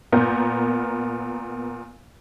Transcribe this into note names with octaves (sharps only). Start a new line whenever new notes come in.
A#2 B3 A#4 G6